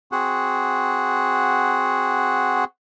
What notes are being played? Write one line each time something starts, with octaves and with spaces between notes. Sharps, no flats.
C4 F#4 G#4 F#5